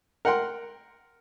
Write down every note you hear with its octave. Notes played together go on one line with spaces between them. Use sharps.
A#4 F#5 G5 C6